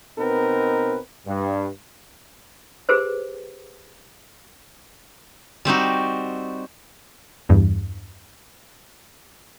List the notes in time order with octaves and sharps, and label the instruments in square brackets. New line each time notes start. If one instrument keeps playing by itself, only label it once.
[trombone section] B2 C4 D#4 A#4 B4
G2
[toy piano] G4 G#4 B4 C5
[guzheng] G3 C4 D#4 F#4
[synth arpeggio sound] E2 G2